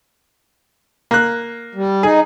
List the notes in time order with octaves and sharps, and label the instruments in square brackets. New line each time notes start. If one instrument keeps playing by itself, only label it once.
[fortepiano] A#3 F#6
[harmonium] G3
[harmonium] D#4 [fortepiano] G#4